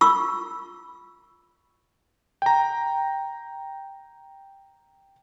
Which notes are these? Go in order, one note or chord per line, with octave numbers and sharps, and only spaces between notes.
F4 C#6 E6
G5 A#5